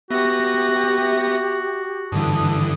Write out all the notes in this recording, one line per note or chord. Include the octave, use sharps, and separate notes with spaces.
B3 F#4 G4 E5 A#6
G2 D3 E3 A5 D#6